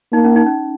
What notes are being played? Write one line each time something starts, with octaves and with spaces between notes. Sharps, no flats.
A#3 D#4
C#4
D#4
C#4